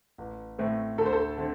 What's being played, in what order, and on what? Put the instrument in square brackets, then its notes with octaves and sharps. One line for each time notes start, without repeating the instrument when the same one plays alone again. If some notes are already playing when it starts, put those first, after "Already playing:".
[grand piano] A1
A2 A3 C4
[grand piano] D2 [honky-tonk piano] A4
[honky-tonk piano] C5
A4
[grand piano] D3 A3 C4